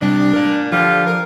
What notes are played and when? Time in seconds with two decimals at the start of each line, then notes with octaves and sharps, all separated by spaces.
0.02 C3 G3 D4
0.33 A#4 D5
0.73 D3 F3 G3 F4
1.06 A#4